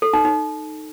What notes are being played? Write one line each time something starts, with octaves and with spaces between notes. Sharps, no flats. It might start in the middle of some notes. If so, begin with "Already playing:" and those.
A4
D#4
D#4